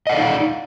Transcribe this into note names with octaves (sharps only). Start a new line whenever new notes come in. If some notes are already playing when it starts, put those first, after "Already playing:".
D#4 D5 D#5 F5 F#5